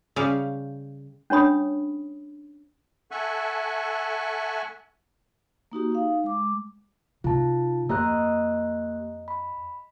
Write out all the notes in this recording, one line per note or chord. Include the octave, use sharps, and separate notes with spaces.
C#3 G3 F5
C#4 D4 C#5 B5 D#6
A4 E5 F#5 G#5 C#6
A#3 D#4 F#4 G4
D#4 F5
G#3 D6
C3 D#4 F4 A5
F2 A#3 G4 D#5 A#5 F#6
B5